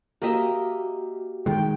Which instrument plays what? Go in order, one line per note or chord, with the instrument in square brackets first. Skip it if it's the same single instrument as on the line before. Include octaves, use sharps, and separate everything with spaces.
[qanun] A#3 D#5 E5 [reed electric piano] F#4 G4
[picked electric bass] D#3 G#3 [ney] G5